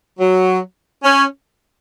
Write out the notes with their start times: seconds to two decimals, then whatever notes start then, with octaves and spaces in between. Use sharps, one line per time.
0.19 F#3
1.04 C#4